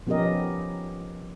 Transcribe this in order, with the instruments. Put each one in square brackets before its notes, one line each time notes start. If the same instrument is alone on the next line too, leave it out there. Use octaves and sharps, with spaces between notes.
[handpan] F3 B3 C#4 G4 A#4 D#5